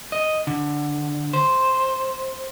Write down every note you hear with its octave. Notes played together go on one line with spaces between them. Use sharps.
D#5
D3
C5